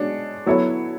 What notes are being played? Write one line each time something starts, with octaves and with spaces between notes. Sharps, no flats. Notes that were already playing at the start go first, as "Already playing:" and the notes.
Already playing: B2 G#3 D4 C#5
F#3 B3 E4 A4 C#5